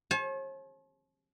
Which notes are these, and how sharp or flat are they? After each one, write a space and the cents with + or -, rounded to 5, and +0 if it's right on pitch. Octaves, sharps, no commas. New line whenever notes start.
C#5 -45 A5 -45